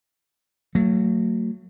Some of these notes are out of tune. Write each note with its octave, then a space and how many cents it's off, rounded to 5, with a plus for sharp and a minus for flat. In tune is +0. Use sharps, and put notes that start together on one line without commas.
F#3 +0 A3 +35